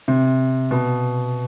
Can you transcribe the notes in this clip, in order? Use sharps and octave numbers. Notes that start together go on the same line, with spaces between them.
C3
B2